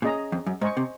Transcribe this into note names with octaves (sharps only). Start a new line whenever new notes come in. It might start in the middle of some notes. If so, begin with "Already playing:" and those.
A#2 C#4 G#4 D#5 A#5
F2
F#2
G#2 C5 D#5 G#5 C#6
C3